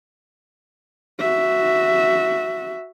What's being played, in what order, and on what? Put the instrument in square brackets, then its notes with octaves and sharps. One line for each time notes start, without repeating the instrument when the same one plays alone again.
[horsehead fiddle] F#4 E5